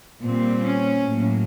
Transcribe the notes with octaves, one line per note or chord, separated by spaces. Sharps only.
A#2 G3 C4
C#4
A2 F#3 A#3